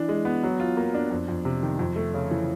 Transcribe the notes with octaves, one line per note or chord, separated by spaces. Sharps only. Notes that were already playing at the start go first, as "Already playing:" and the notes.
Already playing: E3 D4
G#3
B3
F#3
F4
A#3
D4
F2
F2
C3
D#3
F2
A3
C#3
E3